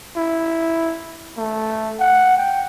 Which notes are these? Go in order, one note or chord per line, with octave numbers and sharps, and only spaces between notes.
E4
A3
F#5
G5